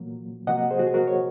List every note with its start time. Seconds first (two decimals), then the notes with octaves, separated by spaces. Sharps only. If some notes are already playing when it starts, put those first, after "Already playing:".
Already playing: A#2 F#3 A#3
0.47 C3 F#3 A#3 D#5 F#5
0.71 G#4 C5
0.79 F#4
0.87 G#4
0.94 F#4 A#4
1.07 C#5